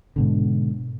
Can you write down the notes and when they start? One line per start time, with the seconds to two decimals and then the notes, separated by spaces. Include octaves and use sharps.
0.16 G#2 B2 D3